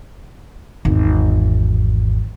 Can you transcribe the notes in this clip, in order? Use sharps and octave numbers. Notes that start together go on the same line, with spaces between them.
G#1 E2